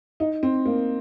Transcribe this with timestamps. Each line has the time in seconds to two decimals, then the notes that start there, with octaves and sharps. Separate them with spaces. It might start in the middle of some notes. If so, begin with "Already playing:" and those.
0.20 D#4
0.43 C4
0.65 A#3